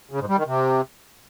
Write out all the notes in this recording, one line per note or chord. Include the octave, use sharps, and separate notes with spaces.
C#3
G#2
G3
D#3
C3